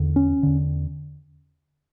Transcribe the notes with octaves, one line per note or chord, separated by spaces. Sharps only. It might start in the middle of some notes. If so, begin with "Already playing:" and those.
Already playing: E2 D3
C#4
E2 D3